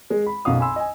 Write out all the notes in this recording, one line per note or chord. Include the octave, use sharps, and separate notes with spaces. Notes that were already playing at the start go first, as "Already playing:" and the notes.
G#3
B5
B1 F#2 F#4 F5 D#6
G#5 B5 C6 E6
D#5 G#5